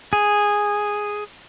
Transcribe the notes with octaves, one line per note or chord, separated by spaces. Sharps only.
G#4